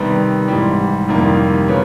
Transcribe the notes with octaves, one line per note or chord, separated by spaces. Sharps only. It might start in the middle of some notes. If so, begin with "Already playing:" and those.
Already playing: C3 D#3 G3 B3
G#2 E3 G3
F2 C3 D#3 G3 A#3
C#3 F#3 B3